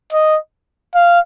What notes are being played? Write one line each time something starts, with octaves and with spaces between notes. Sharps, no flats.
D#5
F5